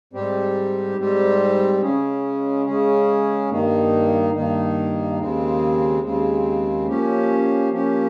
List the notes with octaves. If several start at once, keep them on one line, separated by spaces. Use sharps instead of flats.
G#2 G3 C4 G4
G#2 G3 C4 G4
C#3 G#3 C#4 G#4
C#3 G#3 C#4 G#4
G2 D#3 A#3 D#4
G2 D#3 A#3 D#4
D#2 C#3 G#3 C4
D#2 C#3 G#3 C4
F3 A#3 C#4 G4
F3 A#3 C#4 G4